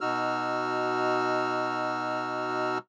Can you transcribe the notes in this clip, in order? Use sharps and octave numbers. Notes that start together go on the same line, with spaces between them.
B2 D#4 F#4 E6 F6